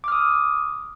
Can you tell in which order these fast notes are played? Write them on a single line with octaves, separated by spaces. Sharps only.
D6 F6 D#6